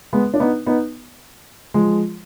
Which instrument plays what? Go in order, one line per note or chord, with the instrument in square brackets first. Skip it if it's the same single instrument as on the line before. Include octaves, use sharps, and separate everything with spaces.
[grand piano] G#3 B3
D4
B3 D#4
B3 D#4
F3 G#3